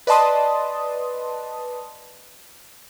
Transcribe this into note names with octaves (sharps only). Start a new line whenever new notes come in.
B4 D5 D#5 A5 C6 D#6